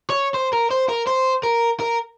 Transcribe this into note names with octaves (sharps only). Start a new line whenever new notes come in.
C#5
C5
A#4
C5
A#4
C5
A#4
A#4